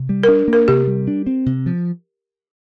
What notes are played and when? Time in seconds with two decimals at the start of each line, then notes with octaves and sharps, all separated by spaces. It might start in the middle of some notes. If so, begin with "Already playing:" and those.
Already playing: C3
0.09 G3
0.23 D4 A#4
0.48 A#3
0.53 A#4
0.68 C3 G4
0.87 G3
1.07 D4
1.27 C4
1.46 C3
1.66 F3